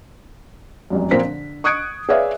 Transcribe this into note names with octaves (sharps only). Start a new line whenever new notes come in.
F1 C2 F#2
A#2 F3 C4 A#4 C5 B6
D3
C#6 D#6 F#6 G#6 C#7 D7
G#4 B4 C#5 D5 E5 F5